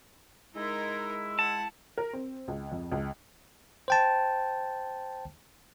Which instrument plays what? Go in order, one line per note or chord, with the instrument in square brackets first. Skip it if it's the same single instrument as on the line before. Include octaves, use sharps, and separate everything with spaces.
[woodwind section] G#3 E4 [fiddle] D#4 A#4
[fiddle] F#5 [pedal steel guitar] A5
[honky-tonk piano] A#4
C4
C#2
F2
C#2
[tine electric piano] C5 G5 A5